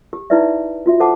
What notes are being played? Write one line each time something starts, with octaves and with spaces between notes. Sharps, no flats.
G4
D#4 E4 B4 D5 E5
F4 F#4 E5
A4 C5 F#5 A5 D6